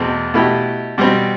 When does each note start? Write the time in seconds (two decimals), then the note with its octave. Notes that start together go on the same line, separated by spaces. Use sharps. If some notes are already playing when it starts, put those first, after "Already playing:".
Already playing: E2 B2 A3 C4
0.34 B2 A3 E4 G4
0.98 B2 G3 C4